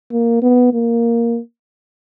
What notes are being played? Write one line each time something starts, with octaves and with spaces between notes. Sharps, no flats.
A#3
B3
A#3